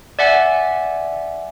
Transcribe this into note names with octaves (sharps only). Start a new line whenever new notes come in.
D5 E5 F#5 G#5